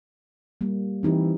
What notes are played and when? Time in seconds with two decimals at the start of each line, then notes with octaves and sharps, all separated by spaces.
0.61 G3 A#3
1.03 E3 C4 D#4 G4